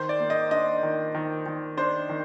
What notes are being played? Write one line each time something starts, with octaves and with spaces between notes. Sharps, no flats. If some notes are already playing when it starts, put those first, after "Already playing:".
Already playing: D#3 C5
D5
A#3
D#5
D4 D#5
D#3
D#3
D#3
D4 C5
D#3